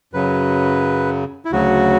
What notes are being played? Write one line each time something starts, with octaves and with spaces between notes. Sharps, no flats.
F#2 C#3 F#3 B4
E4
D2 C#3 F#3 F#4